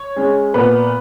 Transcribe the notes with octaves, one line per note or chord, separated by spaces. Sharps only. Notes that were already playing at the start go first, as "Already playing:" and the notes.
Already playing: C#5
G#3 C#4
A#2 B3 B4